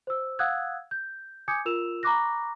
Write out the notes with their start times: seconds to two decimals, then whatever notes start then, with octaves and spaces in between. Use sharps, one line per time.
0.07 C5 E6
0.39 F5 F#5 D#6 E6 F#6 G#6
0.91 G6
1.48 G#5 D6 D#6 G6 G#6 C#7
1.65 F4 A#4 E6 E7 F7
2.03 A#5 B5 C#6 D6 F#6 A#6